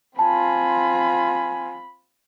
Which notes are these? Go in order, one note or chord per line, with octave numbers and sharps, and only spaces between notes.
C4 F4 G#5 A5 B5